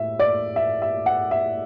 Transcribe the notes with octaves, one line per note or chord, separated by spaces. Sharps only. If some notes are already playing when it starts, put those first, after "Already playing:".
Already playing: A2 E5
D5
E5
E5
F#5
E5